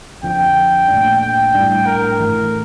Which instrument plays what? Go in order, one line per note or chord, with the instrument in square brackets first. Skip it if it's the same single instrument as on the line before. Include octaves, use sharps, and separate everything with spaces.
[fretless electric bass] F2 D3 F3 [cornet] G5
[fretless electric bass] A#2 A3 D4
[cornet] G5
[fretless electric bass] A2 G3 D4
[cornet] A#4
[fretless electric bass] A2 E3 A3